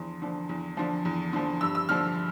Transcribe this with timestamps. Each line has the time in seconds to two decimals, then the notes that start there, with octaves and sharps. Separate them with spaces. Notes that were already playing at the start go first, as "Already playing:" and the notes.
Already playing: E2 D3 F3 C6
0.22 D3 F3
0.49 E2
0.77 D3 F3
1.05 E2
1.33 D3 F3
1.61 G2 E6
1.75 E6
1.89 D3 F3 F6